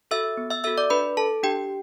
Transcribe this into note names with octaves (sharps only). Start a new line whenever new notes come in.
F#4 A4 E5 E6
B3
E5 E6
F#4 A4 E5 E6
D5 D6
D4 B4 B5
A4 A5
D4 G4 G5